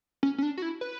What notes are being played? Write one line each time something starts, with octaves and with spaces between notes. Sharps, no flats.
C#4
C#4
D4
F#4
E4
B4